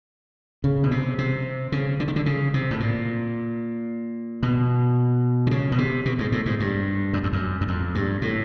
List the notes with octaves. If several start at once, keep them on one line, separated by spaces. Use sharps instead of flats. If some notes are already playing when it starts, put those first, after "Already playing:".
C#3
B2
C3
C3
C#3
D3
D#3
D3
C#3
C3
A2
A#2
B2
D3
C#3
B2
C3
B2
G#2
A2
G#2
G2
F#2
F2
F#2
F#2
F2
G2
A2